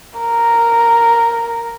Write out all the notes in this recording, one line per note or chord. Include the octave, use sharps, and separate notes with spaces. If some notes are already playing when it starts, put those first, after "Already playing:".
A#4